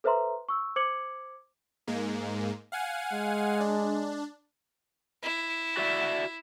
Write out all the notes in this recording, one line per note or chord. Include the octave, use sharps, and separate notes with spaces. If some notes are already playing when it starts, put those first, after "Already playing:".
A4 B4 C5 E5 A#5 C6
C#6 E6
C5 D6 G#6 C#7 F#7
G#2 G#3 A#3
F5 F#5 G#5
G#3
D4
E4
F#4 D5 E5